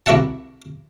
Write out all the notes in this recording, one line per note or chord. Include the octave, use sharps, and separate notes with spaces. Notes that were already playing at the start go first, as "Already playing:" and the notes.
C2 A#3 F#4 E5 F#5 A5